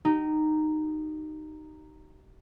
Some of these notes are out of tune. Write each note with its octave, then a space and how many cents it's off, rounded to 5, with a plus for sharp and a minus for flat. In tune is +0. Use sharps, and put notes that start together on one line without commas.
D#4 -10 G4 -40